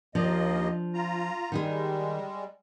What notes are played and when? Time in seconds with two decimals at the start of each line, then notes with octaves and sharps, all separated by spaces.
0.15 D#2 F3 A#3 D4 D#5
0.94 F4 A#5
1.52 D#3 G3 G#3 D#4 G#4